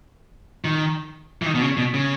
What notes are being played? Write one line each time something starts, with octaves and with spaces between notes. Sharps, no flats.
D#3
E3
D#3
B2
C#3
B2
C#3